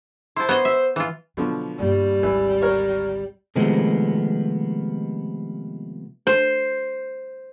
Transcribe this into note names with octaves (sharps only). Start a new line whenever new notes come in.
E4 C5 A5
B3 C#5 D#5
E5
E3 F4
B2 D3 F3 F#3
G2 G3 A#3
G#1 D2 E3
A#4 C#5
C3 D#3 F3 G#3 A3 B3
C5